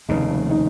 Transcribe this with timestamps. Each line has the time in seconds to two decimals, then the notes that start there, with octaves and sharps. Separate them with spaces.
0.09 F1 D#2 C#3 D#4
0.51 D#4